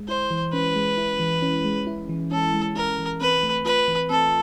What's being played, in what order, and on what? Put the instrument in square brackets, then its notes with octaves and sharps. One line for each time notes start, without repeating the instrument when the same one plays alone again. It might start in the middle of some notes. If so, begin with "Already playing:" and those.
Already playing: [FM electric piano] G#3
[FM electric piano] E4 [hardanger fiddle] C5
[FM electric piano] E3
[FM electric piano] C#4 [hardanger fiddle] B4
[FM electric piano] G#3
E4
E3
C#4
G#3
E4
E3
[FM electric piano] C#4 [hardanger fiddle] A4
[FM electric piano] G#3
[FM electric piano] E4 [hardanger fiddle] A#4
[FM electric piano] E3
[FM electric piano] C4 [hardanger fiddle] B4
[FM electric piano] A3
[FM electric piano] F4 [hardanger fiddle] B4
[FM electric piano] E3
[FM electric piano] C4 [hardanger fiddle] A4